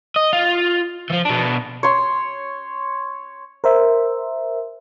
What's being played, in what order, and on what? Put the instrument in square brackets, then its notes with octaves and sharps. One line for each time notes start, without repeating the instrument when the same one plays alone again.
[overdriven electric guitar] D#5
F4
E3 F3
B2 D4
[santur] C#5 C6
[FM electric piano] A#4 C5 E5